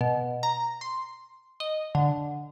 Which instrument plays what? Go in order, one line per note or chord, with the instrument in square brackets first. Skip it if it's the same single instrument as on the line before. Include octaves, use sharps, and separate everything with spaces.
[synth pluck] B2
A#5
C6
D#5
D3